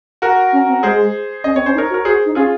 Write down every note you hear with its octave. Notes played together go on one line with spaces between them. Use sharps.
F#4 A#4
C#4
C4
G#3 G#4 C5
C#4 D#5
C4 C#5
C#4 C5
D#4
A#4 C#5
F#4
A#4
F#4 G#4 C5
D#4
C#4 F4 G#4